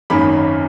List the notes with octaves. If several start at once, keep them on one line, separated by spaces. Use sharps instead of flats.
G#1 F#2 D#3 A#3 C#4 B5